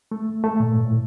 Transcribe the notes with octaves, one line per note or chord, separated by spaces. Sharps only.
A3
A3
A#2
G2
A2